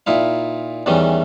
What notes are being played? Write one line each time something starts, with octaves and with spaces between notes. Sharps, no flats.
A#2 D#4 E4 F5
E2 D#3 E3 G3 C#4